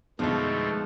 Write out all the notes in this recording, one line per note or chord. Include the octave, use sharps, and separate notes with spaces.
F2 B2 D3 F3 G#3 A3 B3 D#4